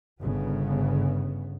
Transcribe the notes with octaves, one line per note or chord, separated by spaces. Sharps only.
G1 C#3 B3